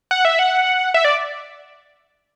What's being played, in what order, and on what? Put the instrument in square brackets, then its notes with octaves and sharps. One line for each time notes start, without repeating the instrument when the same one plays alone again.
[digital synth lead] F#5
E5
F#5
E5
D5